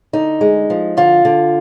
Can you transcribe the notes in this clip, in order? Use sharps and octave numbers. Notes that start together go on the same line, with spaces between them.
D3 D#4
G#3
F3
D3 F4
D3